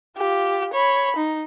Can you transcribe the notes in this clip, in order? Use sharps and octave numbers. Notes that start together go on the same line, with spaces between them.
F4 G4
C#5 B5
D#4